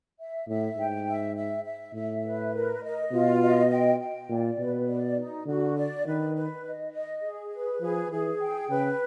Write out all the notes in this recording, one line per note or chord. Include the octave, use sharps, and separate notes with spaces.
E5
A2 E5
G#2 G5
E5
E5
E5
A2 E5
B4
A#4
D#5
B2 F4
D#5
G5
G5
A#2 D5
B2 B4
D5
D#4
D3 F#4
D5
D#3 B4
B4
D#5
D#5
G#4
B4
F3 G#4
E3 G#4
G5
C#3 B4